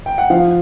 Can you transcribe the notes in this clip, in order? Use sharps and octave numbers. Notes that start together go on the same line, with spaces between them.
G5
F#5
F3 F5